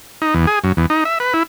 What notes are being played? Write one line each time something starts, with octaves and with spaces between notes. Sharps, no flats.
D#4
E2
G#4
F#2
E2
D#4
E5
B4
E4